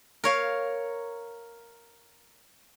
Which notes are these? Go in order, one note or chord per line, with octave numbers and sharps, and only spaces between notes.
A#4 C#5 F5